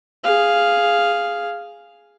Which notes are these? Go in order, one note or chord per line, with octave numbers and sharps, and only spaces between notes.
G#4 F5